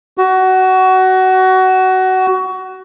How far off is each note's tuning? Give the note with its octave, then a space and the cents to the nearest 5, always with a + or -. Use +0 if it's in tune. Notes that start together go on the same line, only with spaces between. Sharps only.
F#4 +20